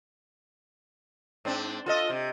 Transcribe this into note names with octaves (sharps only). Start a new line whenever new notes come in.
G#2 C4 D4
F4 A4 D#5
C3